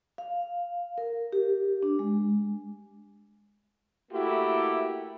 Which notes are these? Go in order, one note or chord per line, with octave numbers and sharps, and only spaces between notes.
F5
A#4
G4
D4
G#3
A3 A#3 E4 F#4 G4